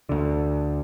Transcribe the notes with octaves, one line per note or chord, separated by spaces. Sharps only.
D2 D3